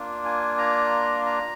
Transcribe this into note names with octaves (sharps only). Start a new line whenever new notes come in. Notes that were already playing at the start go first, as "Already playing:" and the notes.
Already playing: A#3 D4 F4
G#5
A#5
A#5